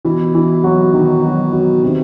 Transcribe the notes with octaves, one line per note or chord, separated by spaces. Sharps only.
B2 E3 E4
E3 E4
F#3 F#4
D#3 D#4
F#3 F#4
F#3 F#4
C3 D#3 D#4